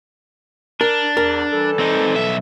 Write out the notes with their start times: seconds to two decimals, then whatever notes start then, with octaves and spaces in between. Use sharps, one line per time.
0.81 D4 A#4
1.17 E2 A#4
1.51 E3 G3 A4
1.80 C4 D#4
2.14 B1 E5